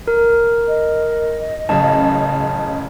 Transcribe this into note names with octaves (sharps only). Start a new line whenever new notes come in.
A#4
D#5
A1 F#2 C#3 A5